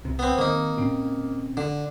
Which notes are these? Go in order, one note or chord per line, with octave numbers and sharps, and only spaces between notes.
C2 C3
B3 C4
D#3 A#3 C4 D#4
A#2 C4 C#4
D3 D4